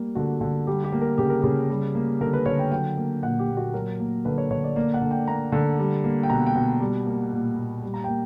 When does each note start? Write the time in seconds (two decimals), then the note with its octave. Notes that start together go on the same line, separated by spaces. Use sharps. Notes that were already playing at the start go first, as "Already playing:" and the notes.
Already playing: G3 A#3 G4
0.15 D3 F#4
0.41 D3
0.67 G3 G4
0.84 G4
0.92 A#3
1.01 A#4
1.18 C#3 G4
1.30 A#4
1.42 C#3 G4
1.70 G3
1.95 A#3
2.21 D3 A#4
2.33 B4
2.46 D3 C#5
2.59 G5
2.71 F#3 G5
2.97 A#3
3.22 A#2 F#5
3.39 G4
3.49 A#2
3.57 F#4
3.74 F#3 A#4
4.00 A#3
4.25 D3 B4
4.38 C#5
4.51 D3 C#5
4.64 D5
4.76 A#3 D5
4.94 F#5
5.02 D3
5.11 G5
5.28 A#3 A#5
5.52 D3
5.79 G3
6.04 A#3
6.23 G5
6.30 B2 A#5
6.46 G5
6.56 B2
6.80 G3
7.06 A#3
7.32 A#2
7.57 A#2
7.83 G3
7.94 A#5
8.04 A#3 G5